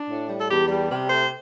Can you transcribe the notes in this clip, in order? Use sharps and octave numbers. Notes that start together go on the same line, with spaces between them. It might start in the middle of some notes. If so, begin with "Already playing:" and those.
Already playing: D4
A2
G3
A4
E2 G4
G3
C3
A3 C5